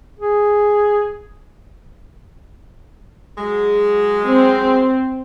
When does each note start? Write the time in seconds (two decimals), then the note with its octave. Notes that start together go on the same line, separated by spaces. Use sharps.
0.19 G#4
3.38 F#3 G#3
4.25 C4